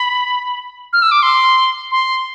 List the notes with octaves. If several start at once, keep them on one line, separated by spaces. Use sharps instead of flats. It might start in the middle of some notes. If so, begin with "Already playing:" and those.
Already playing: B5
F6
E6
D6
C6
C6